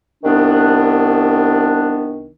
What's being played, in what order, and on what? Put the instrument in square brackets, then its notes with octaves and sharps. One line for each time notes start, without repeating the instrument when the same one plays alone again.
[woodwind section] C2 D#3 B3 D4